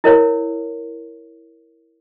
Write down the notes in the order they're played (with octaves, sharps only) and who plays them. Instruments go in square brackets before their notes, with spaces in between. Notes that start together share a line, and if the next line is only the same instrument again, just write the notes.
[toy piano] E4 A#4 C#5